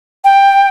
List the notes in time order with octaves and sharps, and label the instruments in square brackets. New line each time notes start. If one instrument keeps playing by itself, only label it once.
[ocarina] G5